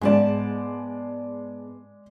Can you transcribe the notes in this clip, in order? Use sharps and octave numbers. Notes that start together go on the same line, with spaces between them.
G#2 G#3 B3 D5 A5